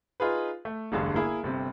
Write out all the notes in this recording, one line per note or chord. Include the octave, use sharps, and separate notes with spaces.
D#4 F4 G#4 B4
A3
E1 A1 G2 D3
A#3 E4 G#4
G1 C3